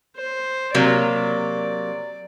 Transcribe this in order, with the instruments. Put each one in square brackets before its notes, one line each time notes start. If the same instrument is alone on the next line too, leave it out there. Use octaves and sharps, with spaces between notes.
[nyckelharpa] C5
[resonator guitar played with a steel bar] C3 F#3 A#3 [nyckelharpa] D5